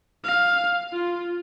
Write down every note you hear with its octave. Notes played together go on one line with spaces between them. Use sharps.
F5
F4